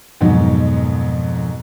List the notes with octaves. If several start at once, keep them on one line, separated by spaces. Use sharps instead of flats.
F2 G#2 B2 D#3 F#3